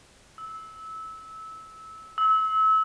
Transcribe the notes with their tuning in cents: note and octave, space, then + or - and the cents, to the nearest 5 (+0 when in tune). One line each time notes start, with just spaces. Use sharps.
E6 -20
E6 -30